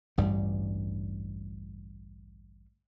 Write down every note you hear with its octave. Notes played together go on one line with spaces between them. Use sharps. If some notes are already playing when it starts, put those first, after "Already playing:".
A1 D2 G2 G3